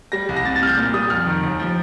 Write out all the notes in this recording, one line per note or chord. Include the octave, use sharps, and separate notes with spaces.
G3 A#6
C2
A#6
C3 A6
A6
C3 F6
G6
A#2 A6
G3 D#6
F2 F6
D#3
D#2
F3